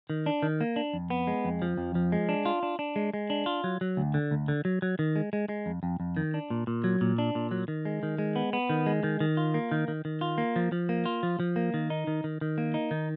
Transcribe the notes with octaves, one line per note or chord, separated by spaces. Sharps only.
D#3
D4
D#3
A#3
D4
F2
B3
G#3
F2
F3
F2
F3
G#3
D4
F4
D4
D4
G#3
G#3
D4
F4
F#3
F#3
D2
D3
D2
D3
F#3
F#3
D#3
G#3
G#3
G#3
F2
F2
F2
D#3
D4
A#2
A#2
F#3
A#2
D4
A#2
F#3
D#3
G#3
D#3
G#3
B3
B3
D#3
G#3
D#3
D#3
F4
A#3
D#3
D#3
D#3
F4
A#3
F3
F3
A#3
F4
F3
F3
A#3
D#3
D#4
D#3
D#3
D#3
A#3
D#4
D#3